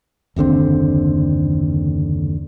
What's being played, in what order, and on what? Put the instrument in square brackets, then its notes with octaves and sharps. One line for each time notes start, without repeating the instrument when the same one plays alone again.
[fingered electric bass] F#1 D#2 D3 C4